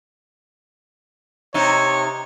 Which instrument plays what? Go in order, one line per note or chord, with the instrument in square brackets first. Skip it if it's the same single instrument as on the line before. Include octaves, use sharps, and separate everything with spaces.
[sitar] C3 D#4 [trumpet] C#5